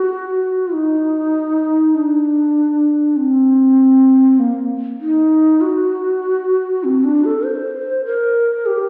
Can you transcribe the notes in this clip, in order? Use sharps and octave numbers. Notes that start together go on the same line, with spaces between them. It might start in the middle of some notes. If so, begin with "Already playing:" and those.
Already playing: F#4
D#4
D4
C4
A#3
D#4
F#4
C4
D4
A4
C5
A#4
G4